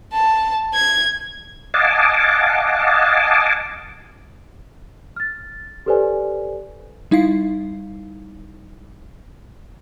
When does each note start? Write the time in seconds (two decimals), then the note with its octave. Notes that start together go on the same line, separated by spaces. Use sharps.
0.13 A5
0.74 G#6
1.74 D#5 F5 F#5 G#5 A5 D6
5.16 F6 A6
5.86 G4 A4 B4 C5 D5 G#5
7.11 G3 D#4 E4 F5 C7